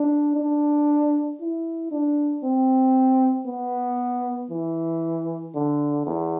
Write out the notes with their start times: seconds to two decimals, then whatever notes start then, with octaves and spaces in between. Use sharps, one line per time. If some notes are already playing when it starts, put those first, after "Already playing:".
Already playing: D4
0.36 D4
1.40 E4
1.91 D4
2.43 C4
3.47 B3
4.50 E3
5.55 D3
6.07 E2